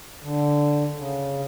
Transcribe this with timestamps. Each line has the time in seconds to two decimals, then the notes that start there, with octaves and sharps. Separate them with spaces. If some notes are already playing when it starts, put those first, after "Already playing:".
0.23 D3
0.98 C#3